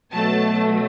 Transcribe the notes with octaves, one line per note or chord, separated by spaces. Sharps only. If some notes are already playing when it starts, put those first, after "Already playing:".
B2 F#3 A3 A5